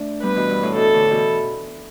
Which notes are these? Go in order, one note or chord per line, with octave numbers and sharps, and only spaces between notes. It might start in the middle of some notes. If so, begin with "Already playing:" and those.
Already playing: A3 D4
G3 B3 B4
B2 E3
G2
A2
B2 A4
A2 D3
B2 E3